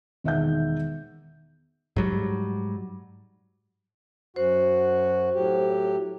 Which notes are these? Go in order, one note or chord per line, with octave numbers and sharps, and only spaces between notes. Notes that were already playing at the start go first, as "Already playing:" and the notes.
E1 D#3 E5 F#5 G6
G#2 F#3 G3
F#2 F#4 C5 F#5
A2 F#3 G4